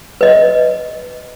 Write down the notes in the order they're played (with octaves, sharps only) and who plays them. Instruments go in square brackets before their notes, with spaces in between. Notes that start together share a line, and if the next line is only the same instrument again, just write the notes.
[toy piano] B4 D#5